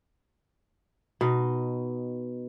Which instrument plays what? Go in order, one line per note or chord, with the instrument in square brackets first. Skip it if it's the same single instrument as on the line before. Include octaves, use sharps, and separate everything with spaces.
[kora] B2 D#4 D#5